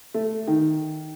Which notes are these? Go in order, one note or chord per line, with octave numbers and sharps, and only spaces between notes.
A3
D#3